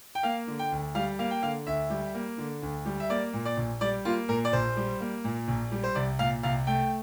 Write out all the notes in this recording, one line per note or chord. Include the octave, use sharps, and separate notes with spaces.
G5
A#3 F5
D3
G5
D2
G3 F5
A#3 F5
G5
D3 F5
D2 E5
G3
A#3
D3
D2
G3
E5
A#3 D5
A#2
D5
A#1
G3 D5
A#3 F4
A#2 A#4
D5
A#1 C5
G3
A#3
A#2
A#1
G3
C5
C2 D5
A#2 F5
C2 F5
A3 G5